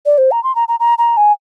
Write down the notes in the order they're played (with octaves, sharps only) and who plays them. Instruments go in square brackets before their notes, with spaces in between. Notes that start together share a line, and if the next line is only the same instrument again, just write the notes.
[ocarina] D5
C5
A#5
C6
A#5
A#5
A#5
A#5
G#5